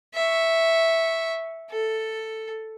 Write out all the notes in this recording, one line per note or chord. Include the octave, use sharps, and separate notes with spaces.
E5 C#6
A4